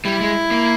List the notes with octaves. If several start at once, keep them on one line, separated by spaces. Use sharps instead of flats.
G3 E4
G#3
A#3